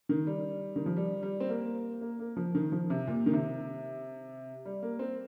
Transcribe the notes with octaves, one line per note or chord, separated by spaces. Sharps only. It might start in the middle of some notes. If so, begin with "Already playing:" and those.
D#3
G3
D#3
F3
G3
G3
C4
A#3
A#3
A#3
F3
D#3
F3
C3
A#2
D#3
C3
G3
A#3
C4